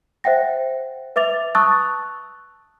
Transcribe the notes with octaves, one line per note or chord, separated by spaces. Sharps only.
C5 E5 F#5 G5 A#6
B4 E5 D6 A6 F7
A5 C#6 D#6 E6 F#6 A6